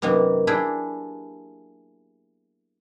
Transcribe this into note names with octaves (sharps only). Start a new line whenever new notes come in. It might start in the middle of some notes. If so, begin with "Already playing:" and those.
F#2 C3 D#3 A#3 B3
D4 E4 G4 G#4 G5